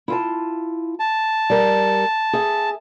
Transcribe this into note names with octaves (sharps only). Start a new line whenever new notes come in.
E4 F4 A5
A5
G3 A#4
G#4 E5